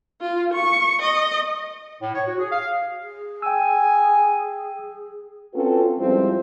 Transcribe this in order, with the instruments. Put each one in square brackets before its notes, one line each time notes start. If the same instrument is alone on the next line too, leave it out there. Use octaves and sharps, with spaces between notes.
[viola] F4
C#6
D#5
[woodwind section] A2
C#5
F#4
G#4
F5
[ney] G#4
[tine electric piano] G5 E6 [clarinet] G#5
[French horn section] C4 C#4 F4 F#4 A4 B4
F2 F3 G3 G#3 C4 E4